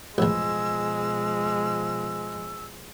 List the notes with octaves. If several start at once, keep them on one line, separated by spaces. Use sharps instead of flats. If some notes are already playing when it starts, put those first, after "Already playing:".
A1 E2 B2 F3 G#3 E6